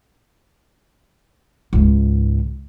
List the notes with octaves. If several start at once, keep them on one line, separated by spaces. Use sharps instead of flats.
C#2 G#2